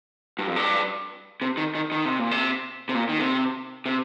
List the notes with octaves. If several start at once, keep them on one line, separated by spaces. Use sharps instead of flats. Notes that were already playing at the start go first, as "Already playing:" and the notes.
G2
F2
G2
C3
D#3
D#3
D#3
C3
A#2
C3
C3
A#2
D#3
C3
C3